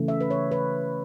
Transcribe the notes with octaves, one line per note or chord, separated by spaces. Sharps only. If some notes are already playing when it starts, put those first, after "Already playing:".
Already playing: C#3 E3 A3
E5
B4
C#5
B4